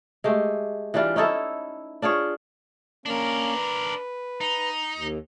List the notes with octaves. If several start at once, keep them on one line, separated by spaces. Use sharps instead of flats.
G#3 A3 G4
E3 G3 D4 F4
C#4 D#4 E4 A4
D4 F4 G#4 C#5
A#3 C#4 D4 A#4
B4
D#4
D#2